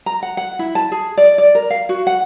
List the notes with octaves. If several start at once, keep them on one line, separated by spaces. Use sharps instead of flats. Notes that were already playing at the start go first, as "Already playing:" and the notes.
A#5
F#5
F#5
E4
A5
G#4
D5
D5
A#4
F5
F#4
F#5